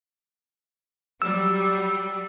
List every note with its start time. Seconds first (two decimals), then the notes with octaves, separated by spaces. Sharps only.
1.22 F#3 G3 E6